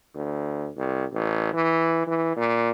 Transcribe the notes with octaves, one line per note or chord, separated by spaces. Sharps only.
D2
C2
A1
E3
E3
A#2